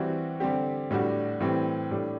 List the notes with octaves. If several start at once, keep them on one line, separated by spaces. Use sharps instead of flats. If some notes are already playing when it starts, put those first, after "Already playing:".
Already playing: E3 G3 C4 F#4
D3 G3 C4 G4
A2 G3 D4 F#4
A2 E3 G3 C4
A2 G3 D4